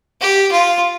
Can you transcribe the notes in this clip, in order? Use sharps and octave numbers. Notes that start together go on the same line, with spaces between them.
G4
F4